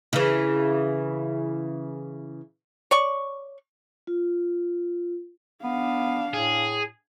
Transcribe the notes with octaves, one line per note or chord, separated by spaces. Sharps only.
C#3 E3
C#5 D5 C#6
F4
B3 D4 F5
A2 G#4